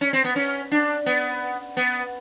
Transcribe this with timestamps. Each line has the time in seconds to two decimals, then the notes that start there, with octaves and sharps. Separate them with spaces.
0.01 C#4
0.13 C4
0.24 B3
0.36 C#4
0.71 D4
1.06 B3
1.77 B3